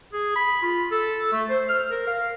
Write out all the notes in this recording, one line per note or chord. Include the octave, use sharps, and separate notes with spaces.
G#4
B5
F4
A4
A3
C5
F6
A#4
F5